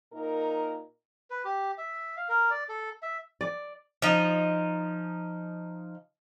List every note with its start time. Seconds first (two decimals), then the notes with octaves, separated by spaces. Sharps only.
0.13 A#2 D#4 A#4
1.30 B4
1.45 G4
1.78 E5
2.17 F5
2.29 A#4
2.50 D5
2.69 A4
3.03 E5
3.41 D5
4.02 F3 D#4